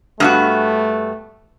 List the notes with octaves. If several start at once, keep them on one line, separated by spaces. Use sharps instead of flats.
G2 A3 B3 F#4